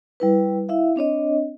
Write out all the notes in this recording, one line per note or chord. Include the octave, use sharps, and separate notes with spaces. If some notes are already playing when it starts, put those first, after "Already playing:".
G3 E4 B4
E4 E5 F5
C4 D4 C#5 D#5